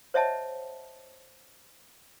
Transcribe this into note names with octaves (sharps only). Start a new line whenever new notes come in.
C5 C#5 D#5 E5 F#5 A5